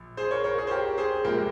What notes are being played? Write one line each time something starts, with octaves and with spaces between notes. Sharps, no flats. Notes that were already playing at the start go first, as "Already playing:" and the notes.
Already playing: A#1
G#4 C5
A#4 C#5
A#4 C#5
G#4
C5
G4 A#4
G#4 C5
A#1 A#2 G#3 G4 A#4